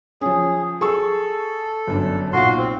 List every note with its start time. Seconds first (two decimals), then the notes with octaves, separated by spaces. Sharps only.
0.21 F3 C#4 G#4
0.81 G#4 A4 C#6 E6
1.87 G1 F#2 D4
2.33 B1 A#2 F#4 F5 C6
2.58 C4